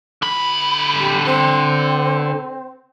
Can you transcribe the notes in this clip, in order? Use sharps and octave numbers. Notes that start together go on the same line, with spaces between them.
D3 B5
G4
C4